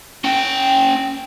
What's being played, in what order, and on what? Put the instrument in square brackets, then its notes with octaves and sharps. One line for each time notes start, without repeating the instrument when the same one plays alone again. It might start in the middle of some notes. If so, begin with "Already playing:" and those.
[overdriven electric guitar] C#4 G5